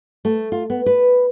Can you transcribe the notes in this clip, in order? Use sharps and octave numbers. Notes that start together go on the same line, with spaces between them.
A3
F4
B3
B4